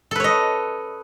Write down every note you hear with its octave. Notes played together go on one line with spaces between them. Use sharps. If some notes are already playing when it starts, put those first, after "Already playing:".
A4 B4 C#5 D#5